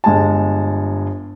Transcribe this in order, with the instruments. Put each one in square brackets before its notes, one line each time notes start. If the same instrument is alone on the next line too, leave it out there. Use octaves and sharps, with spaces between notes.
[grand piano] G1 G#3 G#5 A5